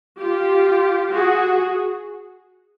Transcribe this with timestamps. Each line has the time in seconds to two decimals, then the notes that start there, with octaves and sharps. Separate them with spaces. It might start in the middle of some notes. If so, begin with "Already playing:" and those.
0.20 F4 G4
1.13 F#4 G#4